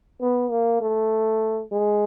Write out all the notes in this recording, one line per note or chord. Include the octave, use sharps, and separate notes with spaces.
B3
A#3
A3
G#3